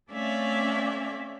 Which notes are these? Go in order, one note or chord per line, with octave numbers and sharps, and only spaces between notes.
A3 C4 C#4 D5 E5 F5